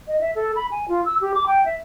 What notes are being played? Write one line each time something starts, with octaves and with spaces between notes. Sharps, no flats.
D#5
E5
A4
B5
G#5
F4
E6
G4
D6
G5
E5